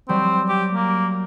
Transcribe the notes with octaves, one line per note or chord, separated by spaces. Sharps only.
F#3 G3 C4
G4
A#3